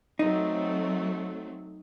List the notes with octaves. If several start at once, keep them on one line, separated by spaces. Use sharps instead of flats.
F#3 A3 C4 D#4